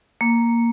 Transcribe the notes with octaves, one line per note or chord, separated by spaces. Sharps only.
A#3